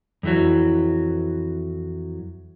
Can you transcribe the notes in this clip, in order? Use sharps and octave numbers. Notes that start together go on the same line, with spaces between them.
F2 E3 F#3